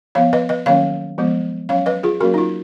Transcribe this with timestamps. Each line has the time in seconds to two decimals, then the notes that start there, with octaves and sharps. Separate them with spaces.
0.15 F3 B3 C#5 F5
0.33 B4 D#5
0.49 B4 D#5
0.66 D#3 F#3 A#3 C#4 C#5 F5
1.18 F3 G#3 B3
1.69 F#3 C#4 C#5 F5
1.86 B4 D#5
2.03 F4 G#4
2.20 F#3 A#3 C#4 F#4 A#4
2.34 D#4
2.38 F4